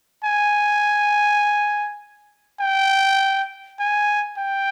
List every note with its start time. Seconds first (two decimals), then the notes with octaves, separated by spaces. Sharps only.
0.25 G#5
2.60 G5
3.80 G#5
4.38 G5